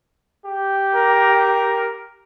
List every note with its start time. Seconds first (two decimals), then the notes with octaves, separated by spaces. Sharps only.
0.46 G4
0.95 A#4